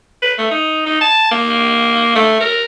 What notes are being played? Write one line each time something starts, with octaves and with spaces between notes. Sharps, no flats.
B4
A3
D#4
D#4
A5
A#3
A3
A#4